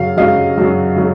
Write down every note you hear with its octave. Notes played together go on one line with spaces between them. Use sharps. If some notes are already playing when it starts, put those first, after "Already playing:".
Already playing: F#2 C#3 F#3 F5
F#2 C#3 F#3 D#5 F5
F#2 C#3 F#3
C#3 F#3